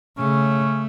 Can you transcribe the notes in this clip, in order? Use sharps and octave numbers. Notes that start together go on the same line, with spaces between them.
C#3 A3 C#4